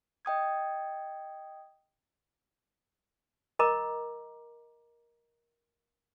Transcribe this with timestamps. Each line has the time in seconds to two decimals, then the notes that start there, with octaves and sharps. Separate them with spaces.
0.25 D#5 G5 D#6 G#6
3.59 A#4 D#5 A#5 D6